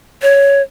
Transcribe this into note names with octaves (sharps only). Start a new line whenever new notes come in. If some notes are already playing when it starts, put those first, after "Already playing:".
C#5